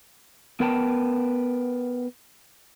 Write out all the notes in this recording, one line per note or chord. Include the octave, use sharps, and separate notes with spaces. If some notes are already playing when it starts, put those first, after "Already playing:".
B3 A#4 B4 G5 A5